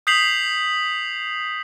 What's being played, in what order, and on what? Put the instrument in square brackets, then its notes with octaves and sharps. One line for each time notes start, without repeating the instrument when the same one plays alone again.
[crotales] D#6 G6 B6 C7 F7 F#7